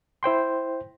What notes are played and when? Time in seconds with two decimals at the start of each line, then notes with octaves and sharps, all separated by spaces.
0.23 E4 C5 G5 C6